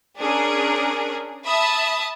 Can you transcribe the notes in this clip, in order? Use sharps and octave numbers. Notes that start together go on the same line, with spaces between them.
C#4 D4 G#4 A#4
E5 A5 B5 D#6